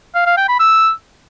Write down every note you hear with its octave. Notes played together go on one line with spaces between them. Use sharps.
F5
F5
G5
B5
E6